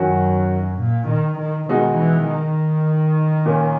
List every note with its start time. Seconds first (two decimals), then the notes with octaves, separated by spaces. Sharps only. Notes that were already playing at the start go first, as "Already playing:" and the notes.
Already playing: F#2 D#3 F#3 C#4 F#4
0.81 A#2
1.11 D#3
1.40 D#3
1.69 B2 D#3 G#3 D#4 F#4
1.99 E3
2.28 D#3
3.45 A#2 A#3 C#4